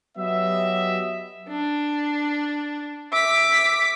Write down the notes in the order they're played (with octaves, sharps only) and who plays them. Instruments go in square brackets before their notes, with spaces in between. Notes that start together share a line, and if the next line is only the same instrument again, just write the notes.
[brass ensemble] F#3 B3 G4 D#5 E5
[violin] D4
[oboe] E5 [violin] D6 B6